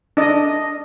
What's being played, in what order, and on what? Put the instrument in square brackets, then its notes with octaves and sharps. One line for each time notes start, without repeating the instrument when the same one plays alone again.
[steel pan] D4 D#5